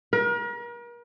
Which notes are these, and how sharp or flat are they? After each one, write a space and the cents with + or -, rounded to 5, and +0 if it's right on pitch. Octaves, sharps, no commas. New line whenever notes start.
A#4 +40